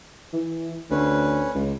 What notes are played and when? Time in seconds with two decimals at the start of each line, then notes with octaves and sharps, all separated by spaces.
0.33 E3
0.91 D2 C#4 B4
1.55 C#2